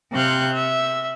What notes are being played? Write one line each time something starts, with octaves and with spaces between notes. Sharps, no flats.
C3 C4 F5 F#6 G6
E5